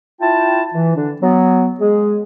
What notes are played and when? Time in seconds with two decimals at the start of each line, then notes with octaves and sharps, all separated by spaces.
0.21 E4 F4 G5 A5
0.74 E3
0.95 D3 D4
1.22 F#3 B3
1.80 G#3 G#4